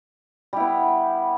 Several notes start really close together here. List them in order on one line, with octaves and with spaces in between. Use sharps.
G3 E4 B3